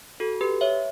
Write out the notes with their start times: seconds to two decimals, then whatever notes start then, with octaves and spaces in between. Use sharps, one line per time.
0.20 F#4 A4
0.41 G4 B4
0.61 C#5 E5